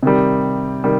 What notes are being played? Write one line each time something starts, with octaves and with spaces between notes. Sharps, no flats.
C3 D#3 G3
C3 D#3 G3